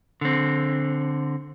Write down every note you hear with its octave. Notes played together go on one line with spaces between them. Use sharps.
D3 C4